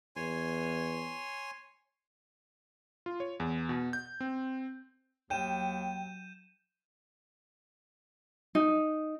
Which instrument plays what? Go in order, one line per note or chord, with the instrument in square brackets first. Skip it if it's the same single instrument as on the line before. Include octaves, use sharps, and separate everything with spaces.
[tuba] E2 [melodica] C#5 G#5 C6
[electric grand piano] F4
C#5
E2
B2
G6
C4
[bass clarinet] D#2 [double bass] F#3 [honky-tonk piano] G5 [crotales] G6 D#7 E7
[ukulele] D#4